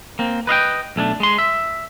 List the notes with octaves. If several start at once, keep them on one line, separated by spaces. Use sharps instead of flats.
A#3 C4
B4 D#5 F5 G5
B1 A3 C#4 D4
G#3 C6
E5